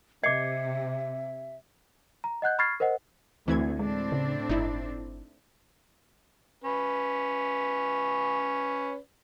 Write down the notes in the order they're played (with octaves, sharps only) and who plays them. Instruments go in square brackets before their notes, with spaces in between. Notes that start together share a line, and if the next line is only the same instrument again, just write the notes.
[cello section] C3 [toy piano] D#5 D6 [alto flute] E5 [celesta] G#6 C7 C#7
[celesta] A#5
D#5 F#5 F#6 G6
B5 C#6 F6 G#6 A6 C7
A#4 C5 D#5 F#5
[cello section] D2 [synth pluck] E3 E4 G#6 [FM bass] C4
[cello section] A2 C4 D4 [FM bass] G#3
[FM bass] C#3
[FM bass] G1 [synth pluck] D#4 E4
[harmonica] C#4 B4